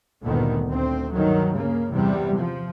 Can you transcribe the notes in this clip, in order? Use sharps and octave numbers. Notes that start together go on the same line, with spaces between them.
G1 D2 A#2 D3 D#3 B3
D2 C4
G2 D#3 F#3
C#3 A#3
E2 C3 G3
F3